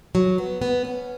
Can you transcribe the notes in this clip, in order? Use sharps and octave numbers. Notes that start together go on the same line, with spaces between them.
F#3
B3
B3
C#4